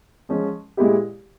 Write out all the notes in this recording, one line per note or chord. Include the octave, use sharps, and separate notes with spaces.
F3 G#3 C#4
A#2 G#3 E4 G4